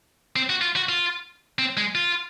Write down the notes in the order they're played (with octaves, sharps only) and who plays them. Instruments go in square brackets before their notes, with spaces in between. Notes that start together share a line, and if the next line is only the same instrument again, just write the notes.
[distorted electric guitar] C4
F#4
F4
F#4
F4
C4
G#3
F4